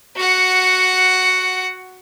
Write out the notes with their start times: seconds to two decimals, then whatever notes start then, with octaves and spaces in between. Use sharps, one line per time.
0.16 F#4 F#5